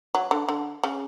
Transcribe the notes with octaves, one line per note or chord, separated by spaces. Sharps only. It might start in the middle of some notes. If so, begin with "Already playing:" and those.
F#3
D3
D3
C#3